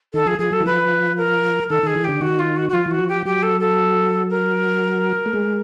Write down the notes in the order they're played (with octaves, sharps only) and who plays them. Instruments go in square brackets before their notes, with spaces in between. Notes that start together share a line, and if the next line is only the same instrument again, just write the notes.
[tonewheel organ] D#3 [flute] A4
[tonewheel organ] F3 [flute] G#4
[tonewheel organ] F3 [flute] G#4
[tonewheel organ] F#3 [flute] A4
[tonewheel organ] E3
[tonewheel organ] F3 [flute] B4
[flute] A#4
[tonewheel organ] D#3 [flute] A4
[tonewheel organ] D#3 [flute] G#4
[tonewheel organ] E3
[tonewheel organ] D3 [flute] G4
[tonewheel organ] D#3 [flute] F#4
[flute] F4
F#4
F#4
[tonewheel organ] F3 [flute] F4
[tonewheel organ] E3 [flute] F#4
[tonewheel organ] F3
[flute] G4
[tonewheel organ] F#3 [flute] G4
[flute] A4
A4
A#4
[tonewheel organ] A3
G#3